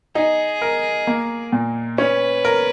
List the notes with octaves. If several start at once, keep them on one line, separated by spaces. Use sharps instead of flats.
D#4 G#4
A#4
A#3
A#2
C#4 B4
A#4